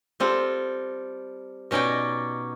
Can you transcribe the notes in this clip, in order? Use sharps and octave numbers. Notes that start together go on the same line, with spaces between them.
G3 C4 F4 A4
B2 C#4 D#4 D5 G5